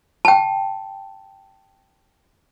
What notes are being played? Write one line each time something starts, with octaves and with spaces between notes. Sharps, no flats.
G5 A5